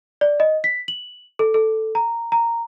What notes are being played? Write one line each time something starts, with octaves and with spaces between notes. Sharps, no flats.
D5
D#5
B6
F#7
A4
A4
A#5
A#5